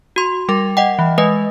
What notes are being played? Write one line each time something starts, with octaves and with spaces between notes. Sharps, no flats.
F#4 C6
G3 A#4
D#5 F#5 G5
E3
G#3 B4 D#5